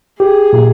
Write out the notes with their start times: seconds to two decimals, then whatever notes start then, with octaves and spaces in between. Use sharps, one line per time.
0.20 G4 G#4
0.53 A#2